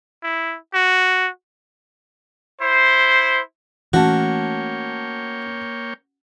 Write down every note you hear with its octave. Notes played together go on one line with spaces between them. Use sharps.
E4
F#4
E4 C5
E3 A3 A#3 C#4 F#4 C#5 G5 A5